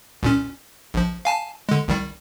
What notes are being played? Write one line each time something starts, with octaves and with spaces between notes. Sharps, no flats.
C2 A#2 C#4
A#1 F3
F5 G#5 A5
D3 G#3
C2 D#3 G3